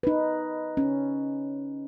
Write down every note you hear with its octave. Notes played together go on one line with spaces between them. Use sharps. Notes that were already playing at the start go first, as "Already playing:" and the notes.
D#4 B4
C#4